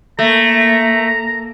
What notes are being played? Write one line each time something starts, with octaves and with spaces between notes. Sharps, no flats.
A3 A#3 A#5